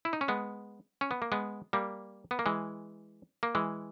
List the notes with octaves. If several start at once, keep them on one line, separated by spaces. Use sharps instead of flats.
E4
D#4
C#4
G#3 B3
C#4
B3
A#3
G#3 B3
G3 A#3
B3
A#3
E3 G#3
A#3
E3 G#3